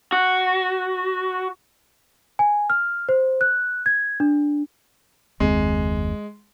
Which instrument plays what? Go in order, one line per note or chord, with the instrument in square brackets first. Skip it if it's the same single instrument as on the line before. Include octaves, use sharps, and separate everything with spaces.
[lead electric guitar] F#4
[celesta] G#5
F6
C5
F#6
G#6
D4
[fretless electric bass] F#1 D#2 C4 [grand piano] G#3